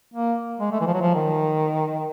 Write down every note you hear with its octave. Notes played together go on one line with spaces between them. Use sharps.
A#3
G#3
A3
E3
F3
F#3
F3
D#3